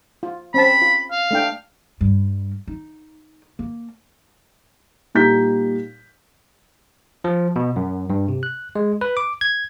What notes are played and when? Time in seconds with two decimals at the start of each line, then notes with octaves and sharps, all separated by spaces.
0.23 F4
0.54 C4 C#4 A5 B5
0.82 F4
1.11 F5
1.31 A3 D4 G5
2.01 G2 G3
2.68 D#4
3.59 A#3
5.15 A#2 G3 D#4 G6 B6
7.24 F3
7.56 B2
7.76 F#2
8.10 G2
8.29 C3
8.43 F#6
8.75 G#3
9.01 B4
9.17 D6
9.41 G#6